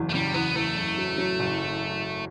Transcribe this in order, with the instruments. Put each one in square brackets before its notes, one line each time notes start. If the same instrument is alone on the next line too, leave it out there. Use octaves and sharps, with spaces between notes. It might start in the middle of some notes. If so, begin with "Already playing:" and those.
Already playing: [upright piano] F#1 E2
[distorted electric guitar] A3
[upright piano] C#3 [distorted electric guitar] G3
[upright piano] E2 [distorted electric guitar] B3
[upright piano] E2 [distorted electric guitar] A3
[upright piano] F#1
F#3
F#3
F#1